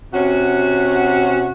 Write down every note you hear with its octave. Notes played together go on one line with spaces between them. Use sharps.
C3 C#4 F#4